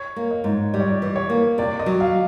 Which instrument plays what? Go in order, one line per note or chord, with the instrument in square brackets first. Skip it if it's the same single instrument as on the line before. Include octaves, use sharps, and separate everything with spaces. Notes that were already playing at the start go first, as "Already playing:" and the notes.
Already playing: [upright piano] C#5
[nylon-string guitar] A#3
[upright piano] D#5
[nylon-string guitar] G#2
[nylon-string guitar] G3 [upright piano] D5
[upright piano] C#5
D5
[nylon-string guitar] E3
[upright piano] C#5
[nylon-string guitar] A#3
[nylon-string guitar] C3 [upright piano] D5
[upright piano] D#5
[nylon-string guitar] F#3
[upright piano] F5